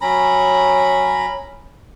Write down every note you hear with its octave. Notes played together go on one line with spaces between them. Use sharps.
F#3 C#4 A#5 B5